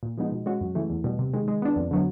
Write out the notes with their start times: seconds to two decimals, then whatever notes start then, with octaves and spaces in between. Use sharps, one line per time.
0.03 A#2
0.18 F3 G#3 B3 D#4
0.32 B2
0.46 G#3 C#4 F#4
0.61 F#2
0.75 C#3 E3 A3
0.90 E2
1.04 B2 G3
1.19 C3
1.34 D#3 G#3
1.48 G#3
1.62 B3 D4
1.76 F2
1.91 D3 F#3 B3